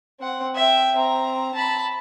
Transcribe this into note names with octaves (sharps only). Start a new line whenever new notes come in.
C4 F#5
E5 G5
C4 A#5
A5 B5